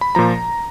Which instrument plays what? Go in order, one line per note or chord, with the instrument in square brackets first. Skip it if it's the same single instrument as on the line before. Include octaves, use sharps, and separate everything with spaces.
[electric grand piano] B5
A#2 F3 A#5